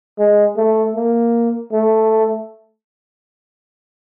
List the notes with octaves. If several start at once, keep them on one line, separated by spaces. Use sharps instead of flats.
G#3
A3
A#3
A3